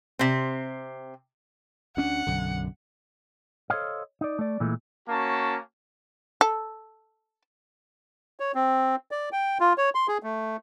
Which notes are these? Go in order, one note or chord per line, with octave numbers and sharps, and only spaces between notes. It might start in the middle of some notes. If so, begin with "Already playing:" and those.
C3 C4
D2 C#4 D4 F#5
B1 F#2 D3
A4 C5 C#5 D#5 F5
D#4 D5
A3 D5
A#2 E3 G#3 A3
A#3 C#4 F#4 A5
A4
C#5
C4
D5
G5
F4
C#5
C6
G#4
A3